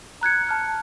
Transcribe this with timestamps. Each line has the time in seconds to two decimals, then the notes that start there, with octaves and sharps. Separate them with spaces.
0.21 A#5 F#6 G#6 C#7
0.47 A5 F6 F#6